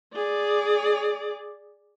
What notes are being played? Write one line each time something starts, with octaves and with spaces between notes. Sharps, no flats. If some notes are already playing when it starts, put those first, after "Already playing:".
G#4 D5